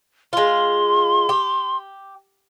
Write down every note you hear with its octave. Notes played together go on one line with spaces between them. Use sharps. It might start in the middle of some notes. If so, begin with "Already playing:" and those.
G#3 F4 C6
G4